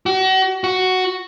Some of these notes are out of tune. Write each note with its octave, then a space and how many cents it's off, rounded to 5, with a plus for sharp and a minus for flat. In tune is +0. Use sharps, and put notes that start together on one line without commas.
F#4 +40
F#4 +5